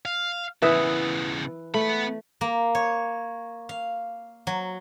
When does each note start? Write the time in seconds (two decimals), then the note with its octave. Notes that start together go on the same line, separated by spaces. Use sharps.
0.05 F5
0.62 C#3 E3 B3 B4 E5 D#6
1.74 A3 B3 B5
2.41 A#3
2.75 C#5
3.69 F5
4.47 F#3